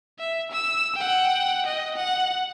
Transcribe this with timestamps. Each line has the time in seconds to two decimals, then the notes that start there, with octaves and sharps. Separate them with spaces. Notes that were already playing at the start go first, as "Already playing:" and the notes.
0.19 E5
0.52 E6
0.96 F#5 G5
1.66 D#5
1.96 F#5